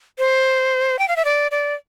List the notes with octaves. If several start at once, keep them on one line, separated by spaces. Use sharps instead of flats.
C5
G5
F5
E5
D5
D5